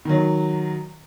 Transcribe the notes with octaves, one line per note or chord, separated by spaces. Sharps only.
D#3 F#3